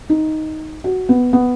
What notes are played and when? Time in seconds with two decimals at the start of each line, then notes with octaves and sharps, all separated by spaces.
0.09 D#4
0.84 F#4
1.09 B3
1.33 B3